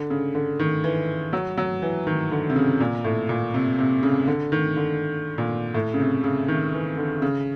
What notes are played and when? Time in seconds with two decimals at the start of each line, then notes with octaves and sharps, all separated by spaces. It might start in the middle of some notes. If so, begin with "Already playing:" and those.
Already playing: D3
0.10 C#3
0.35 D3
0.60 D#3
0.84 E3
1.33 F#3
1.58 F#3
1.82 E3
2.07 D#3
2.31 D3
2.50 C3
2.56 C#3
2.80 A#2
3.04 A2
3.29 A#2
3.54 C3
3.79 C3
4.03 C#3
4.27 D3
4.52 D#3
4.77 D3
5.38 A#2
5.74 A2
5.94 C#3
6.00 C3
6.24 C#3
6.48 D#3
6.73 E3
6.98 D3
7.22 C#3